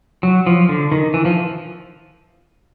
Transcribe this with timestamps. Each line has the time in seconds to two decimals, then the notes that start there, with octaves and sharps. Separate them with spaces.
0.23 F#3
0.47 F3
0.69 D3
0.92 D#3
1.14 E3
1.25 F3